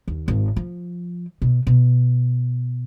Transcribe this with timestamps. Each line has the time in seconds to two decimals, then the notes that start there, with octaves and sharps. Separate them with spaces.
0.08 D#2
0.28 G#1
0.56 F3
1.42 B2
1.67 B2